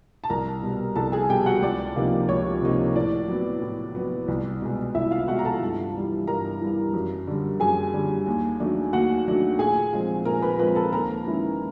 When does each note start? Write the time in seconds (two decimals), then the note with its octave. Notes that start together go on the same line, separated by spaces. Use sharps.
0.24 A5
0.30 C2 A#4 A#5
0.63 B2 G3
0.96 C2 A4 A5
1.12 G#4 G#5
1.29 B2 G3 G4 G5
1.46 F#4 F#5
1.62 C#2 D5
1.96 C3 F3 A#3 D#4
2.29 C#2 C#5
2.62 C3 F3 A#3 D#4
2.96 A2 D5
3.28 F#3 B3
3.62 A2
3.95 F#3 B3
4.28 C2
4.62 B2 G#3
4.95 C2 E4 E5
5.11 F4 F5
5.28 B2 G#3 F#4 F#5
5.39 A#5
5.44 A4 A5
5.62 G2
5.94 E3 G3
6.27 G2 A#4 A#5
6.61 E3 G3
6.93 F#2
7.27 D3 G3
7.60 F#2 G#4 G#5
7.93 D3 G3
8.26 D#2
8.60 D#3 F#3 A3 D4
8.93 D#2 F#4 F#5
9.26 D#3 F#3 A3 D4
9.59 A#2 G#4 G#5
9.93 F3 G#3 C4
10.25 A#2 A#4 A#5
10.42 B4 B5
10.59 F3 G#3 C4 B4 B5
10.75 A4 A5
10.92 D#2 A#4 A#5
11.26 D#3 G#3 C#4 E4